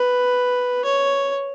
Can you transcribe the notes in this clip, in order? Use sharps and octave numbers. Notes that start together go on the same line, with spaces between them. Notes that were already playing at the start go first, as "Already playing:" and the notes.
Already playing: B4
C#5